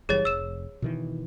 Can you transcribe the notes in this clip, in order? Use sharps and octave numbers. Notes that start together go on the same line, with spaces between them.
F#1 E3 G3 G#4 C#5 A6
F1 E6 E7
B2 D#3 E3